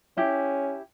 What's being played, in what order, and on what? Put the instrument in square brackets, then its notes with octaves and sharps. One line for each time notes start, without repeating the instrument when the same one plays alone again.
[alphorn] C#4 [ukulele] E4 G4